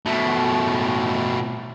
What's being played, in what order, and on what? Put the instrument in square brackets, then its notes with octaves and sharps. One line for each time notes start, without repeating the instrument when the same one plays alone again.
[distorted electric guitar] B2 A3